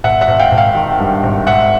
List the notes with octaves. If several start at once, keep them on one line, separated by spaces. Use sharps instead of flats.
G#1 E5 F#5
E5 F#5
G#1
F5 G5
G#1
F5 G5
D#3
G2
G#1
G#2 E5 F#5